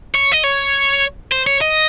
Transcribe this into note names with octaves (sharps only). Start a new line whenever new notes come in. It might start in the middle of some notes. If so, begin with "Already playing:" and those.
C#5
D#5
C#5
C5
C#5
D#5